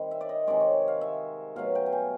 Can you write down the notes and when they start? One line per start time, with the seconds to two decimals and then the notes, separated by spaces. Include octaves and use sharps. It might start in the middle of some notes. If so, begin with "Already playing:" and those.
Already playing: D#3 G3 C4
0.11 E5
0.21 D5
0.29 D#5
0.47 C3 D#3 G#3 D5
0.60 C#5
0.88 F5
1.01 E5
1.56 B2 F#3 A3 F5
1.75 G5
1.86 G#5
1.92 G5